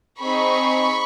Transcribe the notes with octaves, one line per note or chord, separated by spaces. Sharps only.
C4 D#4 G#4 B5 C#6